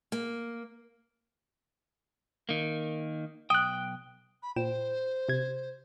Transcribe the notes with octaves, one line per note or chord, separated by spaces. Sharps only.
A#3
D#3 A#3
B1 G5 D#6 F#6
B5
A#2 C5 G5 E7
C3 G#6